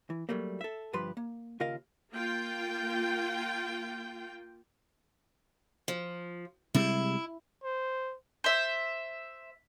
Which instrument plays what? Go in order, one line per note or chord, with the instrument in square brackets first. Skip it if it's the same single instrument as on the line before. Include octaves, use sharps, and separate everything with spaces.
[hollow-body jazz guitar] E3
F#3 G3 A3 A#3
A4 E5
D2 G2 F3 G4 B4 C6
A#3
D#2 C#3 F4 A#4 D#5 F5
[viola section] A#3 F4 G5
[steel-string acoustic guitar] F3
[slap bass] C3 G3 G#3 [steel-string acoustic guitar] E4
[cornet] C5
[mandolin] C5 E5